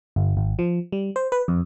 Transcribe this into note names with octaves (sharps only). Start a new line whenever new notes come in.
G1
G#1
F3
G3
C5
B4
F2